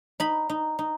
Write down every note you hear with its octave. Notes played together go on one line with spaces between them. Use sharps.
D#4 B5
D#4
D#4